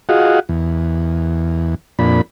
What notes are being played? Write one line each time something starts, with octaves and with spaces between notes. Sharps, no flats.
F4 F#4 G#4 D#5 F5 F#5
E2
F2 A#2 D4 B5